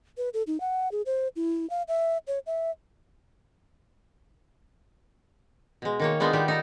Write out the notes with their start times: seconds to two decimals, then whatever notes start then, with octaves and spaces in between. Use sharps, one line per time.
0.17 B4
0.34 A4
0.47 D#4
0.60 F#5
0.92 G#4
1.06 C5
1.36 E4
1.70 F5
1.88 E5
2.27 C#5
2.46 E5
5.82 B2 G#3
6.00 D#3 A#3 C#5
6.20 G#3 B3 D4 D#4 F4
6.33 D#3 G3 B3 G4
6.48 D#4 A4 A#5